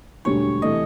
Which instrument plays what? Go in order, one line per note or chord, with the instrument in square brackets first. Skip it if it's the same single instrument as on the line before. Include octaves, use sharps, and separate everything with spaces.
[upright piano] E1 D2 D3 G3 [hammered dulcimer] C#5
[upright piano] C3 E3 A3 [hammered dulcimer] D#5